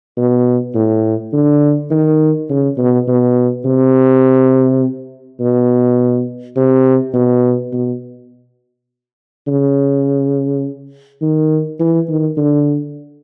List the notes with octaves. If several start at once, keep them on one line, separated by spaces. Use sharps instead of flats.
B2
A2
D3
D#3
C#3
B2
B2
C3
B2
C3
B2
B2
C#3
D#3
E3
D#3
D3